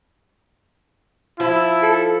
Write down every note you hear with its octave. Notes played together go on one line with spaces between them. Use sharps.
F3 E4
A4